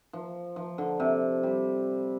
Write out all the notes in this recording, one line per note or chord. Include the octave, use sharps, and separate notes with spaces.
F3
F3
D3
C3
G3